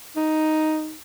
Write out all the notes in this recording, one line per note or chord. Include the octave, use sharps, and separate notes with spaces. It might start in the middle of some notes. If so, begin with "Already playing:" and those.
D#4